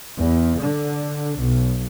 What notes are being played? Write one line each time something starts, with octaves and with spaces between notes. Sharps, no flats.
E2
D3
B1